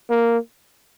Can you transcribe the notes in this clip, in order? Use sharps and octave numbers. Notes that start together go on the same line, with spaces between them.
A#3